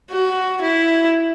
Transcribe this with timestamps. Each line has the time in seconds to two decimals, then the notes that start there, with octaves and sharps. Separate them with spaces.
0.12 F#4
0.62 E4